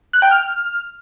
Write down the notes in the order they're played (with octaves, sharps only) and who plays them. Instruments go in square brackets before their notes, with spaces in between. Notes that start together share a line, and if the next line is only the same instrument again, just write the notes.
[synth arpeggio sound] F#6
G5
F6